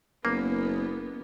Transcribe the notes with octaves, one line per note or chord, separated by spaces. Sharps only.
F#1 A#3 B3